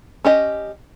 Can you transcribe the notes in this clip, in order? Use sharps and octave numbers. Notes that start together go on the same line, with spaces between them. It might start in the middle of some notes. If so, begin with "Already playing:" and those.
C#4 G4 D#5